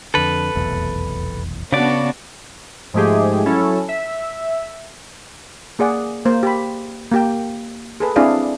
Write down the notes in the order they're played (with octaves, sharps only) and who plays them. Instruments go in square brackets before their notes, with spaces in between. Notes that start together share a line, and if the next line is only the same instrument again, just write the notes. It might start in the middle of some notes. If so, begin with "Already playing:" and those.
[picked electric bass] F2 D3 [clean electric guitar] A4 B4
[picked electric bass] F1 B1 E2
[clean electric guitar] C#3 D5 [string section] B3 D4 F#4
[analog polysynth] G#2 F3 G#3 A3 G4 G#4
F#3 C#4 E4 A4
E5
[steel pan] A#3 G#4 D5 F#5
A#3 C5
G4 B5
A#3 G4 G5
G#4 A4 B4
C4 D4 E4 G#4 D5 F5